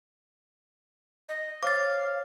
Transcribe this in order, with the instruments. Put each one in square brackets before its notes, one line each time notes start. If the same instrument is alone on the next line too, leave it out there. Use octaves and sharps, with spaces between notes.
[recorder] D#5
[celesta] C5 C#5 F6 [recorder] F5 [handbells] D6 A6